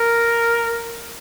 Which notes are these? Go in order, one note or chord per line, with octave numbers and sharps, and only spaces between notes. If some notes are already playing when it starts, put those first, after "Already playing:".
Already playing: A#4